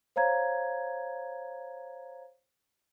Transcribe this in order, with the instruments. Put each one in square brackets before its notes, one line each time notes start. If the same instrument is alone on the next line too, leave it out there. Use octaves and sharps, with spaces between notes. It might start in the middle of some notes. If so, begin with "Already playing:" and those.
[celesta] C5 C#5 F5 A#5 G#6